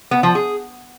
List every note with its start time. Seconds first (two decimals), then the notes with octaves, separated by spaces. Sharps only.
0.11 B3
0.23 F3
0.35 G#4